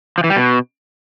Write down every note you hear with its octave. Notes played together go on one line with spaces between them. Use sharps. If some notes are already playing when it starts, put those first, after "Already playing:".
F3
E3
G3
B2